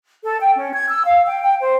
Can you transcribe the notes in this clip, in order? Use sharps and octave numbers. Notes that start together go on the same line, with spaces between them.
A4
G5
C#4
G#6
E6
F5
G5
G5
C5